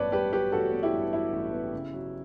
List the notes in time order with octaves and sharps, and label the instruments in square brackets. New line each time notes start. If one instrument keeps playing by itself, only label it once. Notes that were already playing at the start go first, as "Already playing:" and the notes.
Already playing: [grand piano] A1 G2 F#3 B3 B4 C#5 D5 A5
G2 G4 B4
F#3 G4 B4
A1 F#4 A4
B3
E4 G4
G2
F#3 E4
A1
B3
C#3
F#3